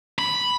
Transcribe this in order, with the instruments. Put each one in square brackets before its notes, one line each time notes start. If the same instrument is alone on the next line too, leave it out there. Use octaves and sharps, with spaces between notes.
[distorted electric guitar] B5